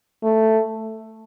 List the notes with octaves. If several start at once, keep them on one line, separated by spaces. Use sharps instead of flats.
A3